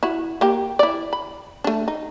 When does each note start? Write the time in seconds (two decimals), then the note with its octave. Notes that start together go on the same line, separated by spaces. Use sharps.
0.03 E4 F#4
0.41 A#3 G4
0.79 E4 D5
1.13 B5
1.64 A3 D4
1.88 D#4